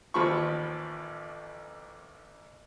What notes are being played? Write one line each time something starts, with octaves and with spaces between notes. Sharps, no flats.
A1 D#2 F3 B5 C#6